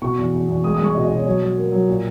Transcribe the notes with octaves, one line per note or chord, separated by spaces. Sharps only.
B2 C#6
E2
E2
E2
G#3 D#6
D#6
G#3
C#6
B2 D#5
D#5
B2
C#5
F#3 C#5
F#3
A#3
F#3
A#2